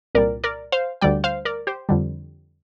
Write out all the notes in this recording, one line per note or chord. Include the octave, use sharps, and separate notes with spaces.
C2 A#2 G3 A#4 D5
A#4 D5
C5 F5
D2 D3 G3 D5 G5
C5 F5
A#4 D5
G4 C5
F2 D3 G3